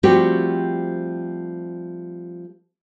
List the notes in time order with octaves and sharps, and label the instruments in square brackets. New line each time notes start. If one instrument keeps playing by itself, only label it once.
[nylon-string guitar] F3 G3 A3 C4 F#4 G4